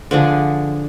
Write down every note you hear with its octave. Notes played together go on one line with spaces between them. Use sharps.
D3 F3 D4 G#4